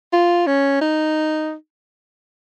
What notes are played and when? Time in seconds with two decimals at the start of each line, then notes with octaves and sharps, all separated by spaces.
0.13 F4
0.47 C#4
0.81 D#4